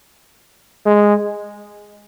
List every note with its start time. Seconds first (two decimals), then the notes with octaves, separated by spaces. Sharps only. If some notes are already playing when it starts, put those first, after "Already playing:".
0.86 G#3